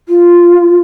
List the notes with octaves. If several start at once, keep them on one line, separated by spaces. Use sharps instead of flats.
F4